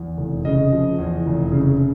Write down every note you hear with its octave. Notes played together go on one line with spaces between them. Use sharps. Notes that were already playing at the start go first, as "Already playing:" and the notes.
Already playing: E2
F1
C#3 D#5
F3
E2
F1
C#3